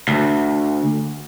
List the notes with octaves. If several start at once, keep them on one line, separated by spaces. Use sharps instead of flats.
D2